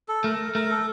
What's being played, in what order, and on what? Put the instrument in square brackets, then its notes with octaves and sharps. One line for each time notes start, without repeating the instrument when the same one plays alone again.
[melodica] A4
[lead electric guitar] A3 [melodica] A#4
[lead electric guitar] A3 [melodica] A#4
[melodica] A4